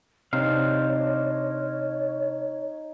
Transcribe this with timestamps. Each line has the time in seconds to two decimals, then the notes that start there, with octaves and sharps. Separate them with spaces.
0.33 C3 D4 D#4 C5 C#5 F5